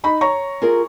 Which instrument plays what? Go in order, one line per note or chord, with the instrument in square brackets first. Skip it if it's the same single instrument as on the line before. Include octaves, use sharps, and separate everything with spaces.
[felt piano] D#4 B5
C#5 A#5 C#6
[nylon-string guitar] F4 G#4 A#4